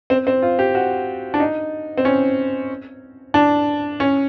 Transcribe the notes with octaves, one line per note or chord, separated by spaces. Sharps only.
C4
C4
F4
G4
F#4
D4
D#4
C4
C#4
D4
C#4